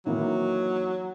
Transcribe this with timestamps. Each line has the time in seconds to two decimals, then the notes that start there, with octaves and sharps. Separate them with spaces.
0.06 D#3 E3 F#3 A#3